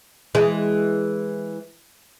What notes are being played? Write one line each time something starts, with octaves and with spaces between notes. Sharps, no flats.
E3 G#3